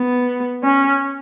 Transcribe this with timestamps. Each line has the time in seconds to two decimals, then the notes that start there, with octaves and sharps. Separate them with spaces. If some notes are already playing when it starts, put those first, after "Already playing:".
Already playing: B3
0.63 C#4